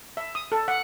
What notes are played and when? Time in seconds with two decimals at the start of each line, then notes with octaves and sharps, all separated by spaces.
0.17 E5
0.35 D#6
0.52 A4
0.68 F#5